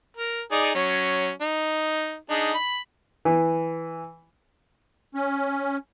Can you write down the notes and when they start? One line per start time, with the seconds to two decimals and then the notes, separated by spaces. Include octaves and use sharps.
0.17 A#4
0.52 D#4 G#4 D5
0.75 F#3 C#4
1.42 D#4
2.30 D4 D#4 G#4
2.54 B5
3.25 E3
5.15 C#4